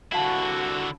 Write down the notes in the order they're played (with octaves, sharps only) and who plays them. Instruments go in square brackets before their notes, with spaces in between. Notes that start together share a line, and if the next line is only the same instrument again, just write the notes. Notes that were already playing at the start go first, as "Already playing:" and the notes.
[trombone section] C2 F#4 [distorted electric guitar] D3 E4 [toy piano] F5 F#5 A5